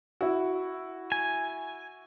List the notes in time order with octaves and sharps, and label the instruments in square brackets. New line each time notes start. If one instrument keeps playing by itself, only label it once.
[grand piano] E4 F#4
[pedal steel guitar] G#5